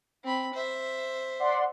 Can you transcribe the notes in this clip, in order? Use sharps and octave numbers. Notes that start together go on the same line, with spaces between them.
C4 B5
C5 E5
D5 F#5 C6